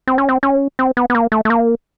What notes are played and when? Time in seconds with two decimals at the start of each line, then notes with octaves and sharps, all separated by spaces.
0.07 C4
0.18 C#4
0.29 C4
0.43 C#4
0.79 C4
0.97 B3
1.10 B3
1.15 A#3
1.32 A3
1.45 A3
1.50 A#3